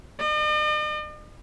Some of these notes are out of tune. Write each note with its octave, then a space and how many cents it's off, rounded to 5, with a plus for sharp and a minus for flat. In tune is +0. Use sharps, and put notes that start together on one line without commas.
D#5 -45